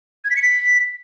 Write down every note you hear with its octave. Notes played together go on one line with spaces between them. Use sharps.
G#6
B6
C#7
B6